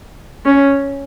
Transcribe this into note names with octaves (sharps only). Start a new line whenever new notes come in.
C#4